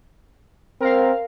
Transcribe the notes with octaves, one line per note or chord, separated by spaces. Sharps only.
C4 A#4 F5